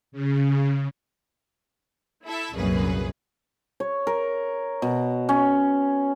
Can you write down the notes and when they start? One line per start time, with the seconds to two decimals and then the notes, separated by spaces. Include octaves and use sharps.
0.12 C#3
2.25 E4 A4 E5
2.54 C2 F#2 A#2 A#3 G#4 B4
3.80 C#5
4.07 A#4
4.82 B2
5.29 C#4